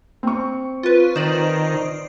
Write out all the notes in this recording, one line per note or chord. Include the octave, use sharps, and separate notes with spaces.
C4 C#6
F4 B4
D#3 C5 D5